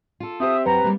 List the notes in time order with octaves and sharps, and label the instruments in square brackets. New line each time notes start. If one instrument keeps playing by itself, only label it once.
[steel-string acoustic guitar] F4 A4
[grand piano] C4 G4 C5 [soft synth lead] E5 [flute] D#6
[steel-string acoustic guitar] F#2 F#5 G5 [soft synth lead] B4 [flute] A#5
[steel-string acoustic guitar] G3 A#3